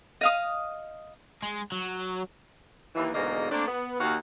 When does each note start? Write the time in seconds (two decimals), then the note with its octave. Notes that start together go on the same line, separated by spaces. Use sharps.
0.21 D#5 F5 D#6
1.43 G#3
1.72 F#3
2.95 D#2 E3
3.15 E2 G#2 B2 D3 A#3 D#5
3.51 A3 A#3 C4 D4
3.68 B3
4.00 D#2 F#4 F5